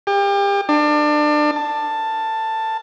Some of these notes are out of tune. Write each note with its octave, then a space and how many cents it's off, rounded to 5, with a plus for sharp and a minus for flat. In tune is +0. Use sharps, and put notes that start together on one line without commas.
G4 +35
D4 +25
A5 +10